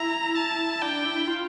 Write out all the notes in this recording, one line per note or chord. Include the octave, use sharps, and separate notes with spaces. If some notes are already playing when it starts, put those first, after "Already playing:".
Already playing: E4 A#5
A5
D4 G5
E4
E4
F4